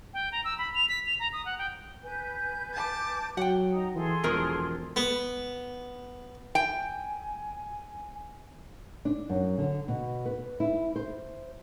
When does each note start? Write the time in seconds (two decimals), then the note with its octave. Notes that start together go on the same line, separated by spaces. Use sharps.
0.14 G5
0.32 A#5
0.45 E6
0.58 B5
0.75 F7
0.89 B6
1.06 F7
1.20 A#5
1.33 D#6
1.45 F#5
1.59 G5
2.04 B4 G#5 G6
2.73 A5 D6
3.37 F#3 F#5 G5
3.73 D#4 A#5 D#6
3.95 E3 G#4 A4 C6
4.24 E1 D#3 F3 A#4
4.96 B3
6.55 G5 G#5
9.05 D4
9.29 F#2
9.58 D3
9.88 B2
10.26 B4
10.60 E4
10.96 C5